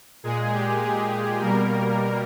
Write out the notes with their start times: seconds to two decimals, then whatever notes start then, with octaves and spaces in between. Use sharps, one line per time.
0.23 A#2 G#3 G#4
0.53 G4
0.82 G#4
1.40 B2 G3 A#3 A#4